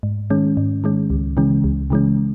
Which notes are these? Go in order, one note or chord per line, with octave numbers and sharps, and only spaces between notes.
G#2
D#3 G#3 C#4
G#2
D#3 G#3 C#4
C#2
C#3 E3 G#3 C#4
C#2
C#3 E3 G#3 C#4